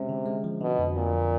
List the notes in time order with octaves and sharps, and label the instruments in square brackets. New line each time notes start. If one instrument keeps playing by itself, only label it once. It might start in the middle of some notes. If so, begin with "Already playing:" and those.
Already playing: [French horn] C3 [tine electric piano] G#3 C#4
[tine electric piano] D3
G#3
F3
[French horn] B2 [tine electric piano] D3
[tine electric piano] F2
[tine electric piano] F2 [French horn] A#2
[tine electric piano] F2